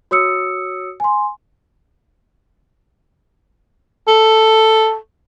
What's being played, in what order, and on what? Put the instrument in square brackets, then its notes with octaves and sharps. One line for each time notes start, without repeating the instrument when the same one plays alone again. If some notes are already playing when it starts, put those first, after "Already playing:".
[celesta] F#4 C#5 D#6 E6 C#7
G#5 C6
[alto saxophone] A4